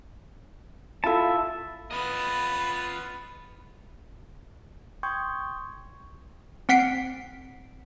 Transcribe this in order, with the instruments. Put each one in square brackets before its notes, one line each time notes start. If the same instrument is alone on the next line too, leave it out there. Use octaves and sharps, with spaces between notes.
[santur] E4 F4 A4 [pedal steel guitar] E5 A5
[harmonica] B3 B4 [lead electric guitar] F4 D#5 [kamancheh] B5
[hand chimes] G5 C6 C#6 D#6 G6 G#6
[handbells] C4 F#5 B6 C7 D7